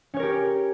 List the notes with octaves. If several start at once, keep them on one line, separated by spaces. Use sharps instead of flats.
C#4 G4 A#4 C#5